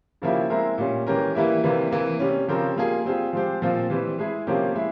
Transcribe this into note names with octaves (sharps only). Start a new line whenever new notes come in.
C#3 F3 A#3 E4 G4
G#3 C4 E4 A#4
A#2 G3 C#4
E3 G#3 C#4 G4 A#4
E3 G3 A#3 E4
C3 E3 G3 A#3
C3 E3 A#3
C3 G3 C#4
C#3 F3 C4 G4 A#4
G3 A#3 F4 G#4
G3 C4 F4 G#4
F3 G#3 C4 G4
A#2 F3 C4 F4
E3 G3 C4
G#3 E4 G#4
C3 F3 A#3 C#4 G4
G#3 E4